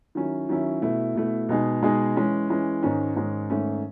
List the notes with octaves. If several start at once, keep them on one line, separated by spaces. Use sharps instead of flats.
D#3 F#3 C#4 E4
D#3 F#3 C#4 E4
B2 A3 E4
B2 A3 E4
B2 G#3 D#4 G#4
B2 G#3 D#4 G#4
E3 G#3 C#4
E3 G#3 C#4
G#2 D#3 G#3 C#4
G#2 D#3 G#3 C#4
G#2 D#3 A3 C#4